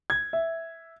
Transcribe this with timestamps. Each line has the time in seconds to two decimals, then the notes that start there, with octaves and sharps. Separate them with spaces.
0.10 G#6
0.33 E5